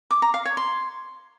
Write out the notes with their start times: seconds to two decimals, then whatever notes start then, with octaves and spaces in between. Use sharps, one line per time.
0.11 D6
0.22 A#5
0.34 F5
0.45 C#5
0.57 C6